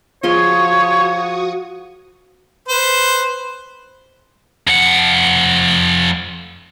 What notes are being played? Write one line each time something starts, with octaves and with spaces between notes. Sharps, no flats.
F3 F#4 G#4 C#5 F5 C6 C#6 D#6
B4 C5
F2 F#5